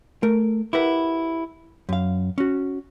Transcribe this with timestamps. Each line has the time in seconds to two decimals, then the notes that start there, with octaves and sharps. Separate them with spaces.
0.23 A3 A#4
0.73 E4 G4 A#4 B4 F#5
1.89 F#2 F5
2.38 C#4 F#4